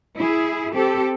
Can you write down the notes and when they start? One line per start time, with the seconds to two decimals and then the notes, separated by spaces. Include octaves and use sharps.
0.17 E4 G#4
0.73 C4 G4 A4